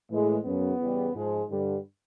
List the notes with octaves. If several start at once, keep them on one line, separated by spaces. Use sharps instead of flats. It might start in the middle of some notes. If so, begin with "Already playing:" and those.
A2 E3 G#3
F#2 C#3 F#3 B3
E2 C#3 E3 G3
G#2 F3 G#3
G2 D3 G3